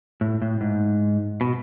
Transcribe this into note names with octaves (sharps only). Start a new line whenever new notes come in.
A2
A2
G#2
B2